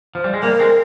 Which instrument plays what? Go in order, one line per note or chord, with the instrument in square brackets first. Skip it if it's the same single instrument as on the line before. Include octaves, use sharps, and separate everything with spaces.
[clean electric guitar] F3
G3
G#3
[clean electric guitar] G3 A#3 [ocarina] A#4
[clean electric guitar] G#3 C4